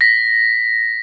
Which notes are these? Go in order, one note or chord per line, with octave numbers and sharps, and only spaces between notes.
A#6 B6